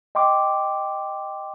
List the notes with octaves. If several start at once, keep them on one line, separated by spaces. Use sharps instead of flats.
D#5 G5 C6 D6